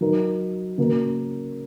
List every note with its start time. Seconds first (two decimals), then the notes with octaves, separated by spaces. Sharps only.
0.01 F#3 D#4 A#4
0.78 C#3 A#3 F#4 A#4